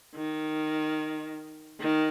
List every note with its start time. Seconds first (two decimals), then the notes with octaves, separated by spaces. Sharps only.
0.16 D#3
1.80 D#3